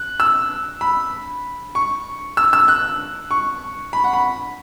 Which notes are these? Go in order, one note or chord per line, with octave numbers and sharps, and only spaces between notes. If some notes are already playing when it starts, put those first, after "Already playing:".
Already playing: F#6
E6
B5
C#6
E6
E6
F#6
C#6
B5
F#5
B5